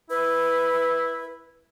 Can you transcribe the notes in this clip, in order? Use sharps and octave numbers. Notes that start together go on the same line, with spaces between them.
E4 B4